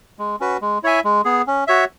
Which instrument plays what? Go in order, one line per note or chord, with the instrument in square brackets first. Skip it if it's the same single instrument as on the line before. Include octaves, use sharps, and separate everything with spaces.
[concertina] G#3
C#4 F#4 B4
G#3
E4 C#5 E5 G#5
G#3
B3 G#4
C#4
F#4 C#5 E5